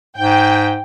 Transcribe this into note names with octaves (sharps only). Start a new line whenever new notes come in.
G#2 G5